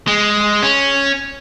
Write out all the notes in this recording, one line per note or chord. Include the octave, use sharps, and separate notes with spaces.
G#3
C#4